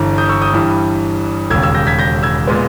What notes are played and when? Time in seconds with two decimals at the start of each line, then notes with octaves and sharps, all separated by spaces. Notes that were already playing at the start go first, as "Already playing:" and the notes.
Already playing: G1 G2 E3
0.18 D#6 G6
0.29 C#6 E6
0.42 D#6 G6
0.53 G2 E3 G3
1.50 E1 D#2 C#3 E6 G#6
1.62 E6 G#6
1.74 G6 A#6
1.87 G#6 B6
1.99 G6 A#6
2.23 E6 G#6
2.47 A#2 G#3 B3